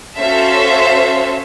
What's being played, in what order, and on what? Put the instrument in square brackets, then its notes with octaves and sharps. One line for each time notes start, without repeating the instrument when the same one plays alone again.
[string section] C#4 F#4 A4 C5 E5 F5